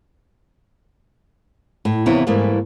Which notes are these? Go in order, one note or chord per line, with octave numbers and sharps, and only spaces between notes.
A2
D#2 C3 E3 B3 E4 C#5
G#2 E3 G3 A3 A#3